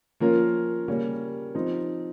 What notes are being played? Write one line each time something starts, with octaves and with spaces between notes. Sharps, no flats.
F3 A#3 C#4 F4 A#4
C#3 G3 A#3 C#4
F3 C4 D#4